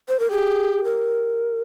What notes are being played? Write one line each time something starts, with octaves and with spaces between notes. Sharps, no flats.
C5
A#4
G4 G#4
A#4